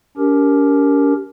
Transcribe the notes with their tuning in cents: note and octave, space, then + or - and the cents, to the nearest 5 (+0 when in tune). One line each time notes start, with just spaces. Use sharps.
C#4 +45 G4 +0 A#4 +0